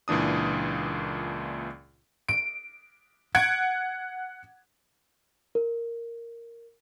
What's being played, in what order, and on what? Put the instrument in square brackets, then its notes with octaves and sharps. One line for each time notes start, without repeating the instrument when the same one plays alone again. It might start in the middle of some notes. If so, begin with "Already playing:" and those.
[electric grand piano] C#2 A#2 E3 D4 D#6
[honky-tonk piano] D7
F#5 G#6 D7
[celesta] A#4